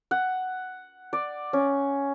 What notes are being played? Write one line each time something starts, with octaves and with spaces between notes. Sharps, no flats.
F#5
D5
C#4